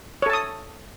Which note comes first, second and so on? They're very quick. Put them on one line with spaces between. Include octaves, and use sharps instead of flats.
C#5 A4 A5 D#6